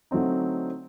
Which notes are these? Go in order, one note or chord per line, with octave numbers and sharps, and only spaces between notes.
D3 F#3 A3 C4 D#4